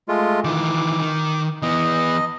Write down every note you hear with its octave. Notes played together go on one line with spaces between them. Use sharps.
G#3 A3 F4
D#3 E3 D6
D#3
E3 B3 D#5